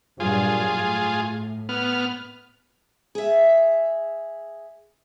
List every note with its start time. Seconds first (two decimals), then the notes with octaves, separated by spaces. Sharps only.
0.20 G2 A#2 F#3 F4 G#4
0.69 A2
1.69 B3 F6
3.15 G#4 E5